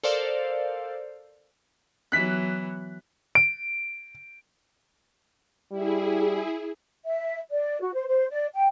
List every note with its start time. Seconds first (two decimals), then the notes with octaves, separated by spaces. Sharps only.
0.03 A4 A#4 C5 D5 F5
2.12 E3 F#3 B3 F#6 B6
3.35 D7
5.72 G3 E4 G#4
7.06 E5
7.50 D5
7.81 F#4
7.94 C5
8.07 C5
8.30 D5
8.54 G5